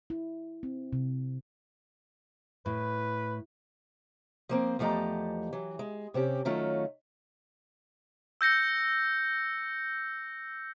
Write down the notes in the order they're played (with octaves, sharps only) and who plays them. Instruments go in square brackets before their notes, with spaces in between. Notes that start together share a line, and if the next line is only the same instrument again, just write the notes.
[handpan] E4
C4
C3
[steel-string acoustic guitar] A2 [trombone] B4
[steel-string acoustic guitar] F3 A#3 C4
E2 F3 A3 G4 D#5 A#5
E3 F#3
G#3
C3 C4 C#4 G4
D#3 F#3 A3 C#4 F4
[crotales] E6 G6 A#6 C#7